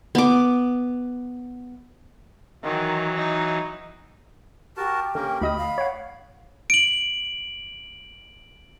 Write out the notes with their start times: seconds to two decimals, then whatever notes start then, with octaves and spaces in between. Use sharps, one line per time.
0.15 B3 D6
2.63 D#3 E3 F#3
3.16 D#4
4.77 F#4 G4 A#4 A5
5.15 D3 A#3 C#4 A#4
5.41 D2 D#5 B5 D#6
5.57 F5
5.78 C#5 F#5
6.70 D7 F#7